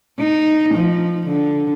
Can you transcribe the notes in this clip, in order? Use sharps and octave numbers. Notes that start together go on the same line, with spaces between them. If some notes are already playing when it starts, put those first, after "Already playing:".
D#4
F3
D3